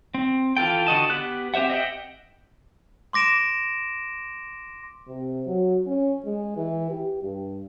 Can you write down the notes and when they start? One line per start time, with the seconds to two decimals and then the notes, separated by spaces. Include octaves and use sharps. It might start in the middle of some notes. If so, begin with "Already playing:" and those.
0.14 C4
0.57 E3 F4 A4 G5
0.87 D3 F#4 D#5 A5
1.10 B3 G4 F#6
1.54 C4 G4 C5 E5 F#5
1.70 D#5 E5 F#5 G5
3.13 C6 D6 A#6 D7 E7
5.08 C3
5.47 F#3
5.87 C#4
6.25 G#3
6.57 E3
6.91 G4
7.23 G2